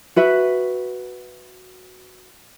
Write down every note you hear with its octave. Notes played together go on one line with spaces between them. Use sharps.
F#4 B4 E5